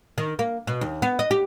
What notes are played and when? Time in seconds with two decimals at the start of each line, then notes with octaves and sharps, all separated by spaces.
0.18 D#3
0.39 A#3
0.67 B2
0.81 D#2
1.02 B3
1.19 D#5
1.31 G4